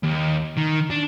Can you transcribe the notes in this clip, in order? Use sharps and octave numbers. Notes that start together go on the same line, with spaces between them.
D#2
D#3
D4